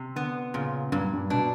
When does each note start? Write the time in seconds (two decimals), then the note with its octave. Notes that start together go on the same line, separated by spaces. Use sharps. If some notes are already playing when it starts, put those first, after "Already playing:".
Already playing: C3
0.16 D3 B3
0.54 A#2 C#3
0.92 G2 A#2
1.13 G2
1.30 B2 D4